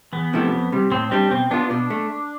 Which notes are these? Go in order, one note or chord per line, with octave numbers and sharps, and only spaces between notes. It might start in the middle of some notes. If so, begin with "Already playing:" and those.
E2 B3
C3 F3 A3 E4
F2
C3 G3
A2 C4
G3 C4 D4
B2 C4
B3 D4 F4
B2 D4
A3